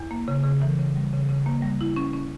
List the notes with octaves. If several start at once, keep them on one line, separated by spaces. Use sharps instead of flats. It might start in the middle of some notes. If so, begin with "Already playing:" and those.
Already playing: E2
A#3
C#3
C#3
E3
C#3
G3
C#3
C#3
A#3
G3
E4
C#4
C#4